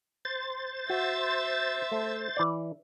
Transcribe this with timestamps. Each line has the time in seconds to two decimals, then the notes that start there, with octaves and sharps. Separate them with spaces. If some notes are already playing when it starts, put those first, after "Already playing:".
0.25 C5 A6
0.90 F#4 E5
1.92 A3
2.37 E3 D5